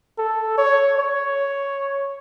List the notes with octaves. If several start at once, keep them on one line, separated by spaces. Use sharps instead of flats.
A4
C#5
C#5